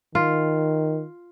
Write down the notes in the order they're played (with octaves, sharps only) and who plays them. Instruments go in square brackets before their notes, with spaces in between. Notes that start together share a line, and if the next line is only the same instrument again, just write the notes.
[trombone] D#3 [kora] F4